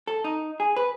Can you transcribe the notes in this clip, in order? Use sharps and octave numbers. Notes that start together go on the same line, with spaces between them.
A4
D#4
G#4
B4